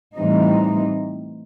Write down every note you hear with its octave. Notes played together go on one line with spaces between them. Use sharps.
A2 E3 G3 C4 D#4